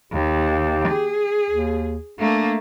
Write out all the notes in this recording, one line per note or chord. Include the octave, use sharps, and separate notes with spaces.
D#2 G4
G#4
D#2
A3 A#3 D4